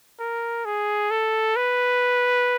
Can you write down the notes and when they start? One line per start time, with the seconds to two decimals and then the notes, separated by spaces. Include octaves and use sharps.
0.19 A#4
0.65 G#4
1.11 A4
1.56 B4